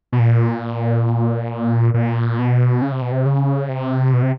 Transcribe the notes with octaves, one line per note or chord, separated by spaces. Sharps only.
B2
A#2
A#2
B2
C#3
C3
B2
C3
C#3
C3
B2
C3